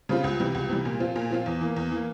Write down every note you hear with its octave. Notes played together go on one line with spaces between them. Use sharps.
C#3 G3 C4 F4
C#2
C3 E3 G3
C#2
C3 E3 G3
A#2
F3 C4 F4
A#2
F3 C4 F4
E2
E3 A#3
E2
E3 A#3